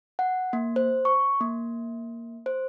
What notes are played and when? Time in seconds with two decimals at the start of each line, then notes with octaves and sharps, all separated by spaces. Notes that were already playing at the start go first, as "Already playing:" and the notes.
0.19 F#5
0.53 A#3
0.76 C5
1.05 C#6
1.41 A#3
2.46 C5